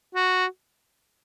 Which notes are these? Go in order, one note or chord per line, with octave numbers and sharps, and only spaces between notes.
F#4